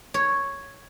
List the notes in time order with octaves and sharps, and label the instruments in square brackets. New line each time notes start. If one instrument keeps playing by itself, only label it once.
[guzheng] C#5